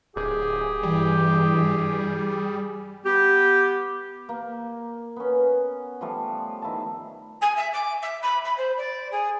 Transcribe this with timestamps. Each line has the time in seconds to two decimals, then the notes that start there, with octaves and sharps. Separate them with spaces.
0.16 D1 G4 G#4
0.83 G2 E3 G3
3.05 B3 G4
4.29 A#3
5.16 B3 C#4
6.01 F3 G3 A3
6.62 D#3 E4 F5 A5
7.41 G#5
7.56 E5
7.73 D6
8.02 E5
8.22 B5
8.44 B5
8.57 C5
8.77 D5
9.11 G#4